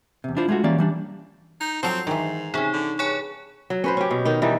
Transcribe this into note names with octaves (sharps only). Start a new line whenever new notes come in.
E2 C3
D4 E4 F4 C5
G#3 A3 F4 F#4
E3 G3 A#3 C#4 D5
E3 G3 D4
D#4 G6
F3 F#3 C4 A4 C7 F7
G#2 D#3 E3
C3 C#4 D#4 G#4
D3
G2 G#4 C#5 G#5
F#3
C#4 B4 C5
C#4 G4
B2
D#3 D#4
E3 G3 D#4